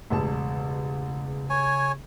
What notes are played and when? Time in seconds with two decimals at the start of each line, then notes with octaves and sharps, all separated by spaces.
0.10 E1 A1 C#3 A5
1.50 C#5 G#5